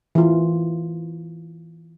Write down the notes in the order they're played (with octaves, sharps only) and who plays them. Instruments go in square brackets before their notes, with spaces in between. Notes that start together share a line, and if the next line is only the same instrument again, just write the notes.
[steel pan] E3 F4